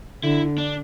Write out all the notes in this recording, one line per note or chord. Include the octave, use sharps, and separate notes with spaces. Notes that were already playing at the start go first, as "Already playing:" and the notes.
D3 E4
D4